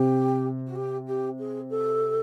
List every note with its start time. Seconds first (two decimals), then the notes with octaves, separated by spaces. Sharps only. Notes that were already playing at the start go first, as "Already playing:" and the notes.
Already playing: C3 G4
0.66 F#4
0.75 G4
1.06 G4
1.38 G#4
1.69 A4